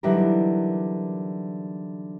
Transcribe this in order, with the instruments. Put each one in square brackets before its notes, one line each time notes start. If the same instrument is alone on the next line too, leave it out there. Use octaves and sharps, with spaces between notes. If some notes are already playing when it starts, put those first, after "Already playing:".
[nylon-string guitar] D3 E3 F#3 G3 D#4 A#4